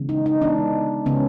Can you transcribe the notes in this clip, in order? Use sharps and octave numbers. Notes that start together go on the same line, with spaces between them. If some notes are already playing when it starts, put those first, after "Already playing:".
Already playing: C#3 E3 G#3 B3
D#4
D#4
C#3 E3 G#3 B3 D4
C#3 E3 G#3 B3 C#4